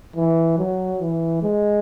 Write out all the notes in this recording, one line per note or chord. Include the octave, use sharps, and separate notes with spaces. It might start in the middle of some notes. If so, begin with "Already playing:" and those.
E3
F#3
E3
G#3